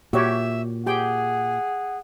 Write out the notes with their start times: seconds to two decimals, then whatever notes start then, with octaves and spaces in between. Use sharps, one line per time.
0.13 A#2 F#4 G4 C#5 E5
0.86 G4 G#4 F#5 G5